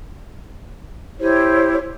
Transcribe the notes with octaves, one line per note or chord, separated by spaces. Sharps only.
E4 G4 C5 C#5